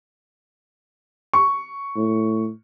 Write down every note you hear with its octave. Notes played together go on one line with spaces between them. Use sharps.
C#6
A2